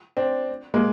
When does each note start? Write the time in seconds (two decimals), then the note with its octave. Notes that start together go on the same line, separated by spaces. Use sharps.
0.17 C4 D4
0.74 G#3 A#3